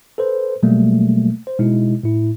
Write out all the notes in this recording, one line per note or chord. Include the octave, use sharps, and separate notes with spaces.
A4 B4 C5
B2 F#3 G3 A3 A#3
C5
B2 G#3 D#4 E4
A2 E4